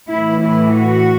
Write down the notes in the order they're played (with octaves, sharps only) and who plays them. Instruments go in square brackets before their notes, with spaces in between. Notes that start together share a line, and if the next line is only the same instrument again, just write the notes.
[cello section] A2 E3 E4
E4
F#4